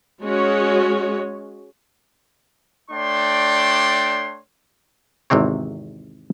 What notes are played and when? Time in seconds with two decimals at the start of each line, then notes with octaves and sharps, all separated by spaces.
0.24 G#3 C#4 F#4 C#5
2.91 A3 D4 C#5 D5 G5 C6
5.30 G#1 E2 C3 C4 C#5